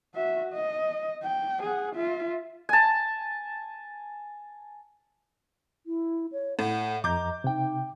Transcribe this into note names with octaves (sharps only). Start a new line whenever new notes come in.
F#4 E5
D#5
G5
G#4 F#5
F4 E5
G#5 A5
E4
C#5
A2 F#5
F2 D#5 A#5 D6 G6
C3 D#4 G5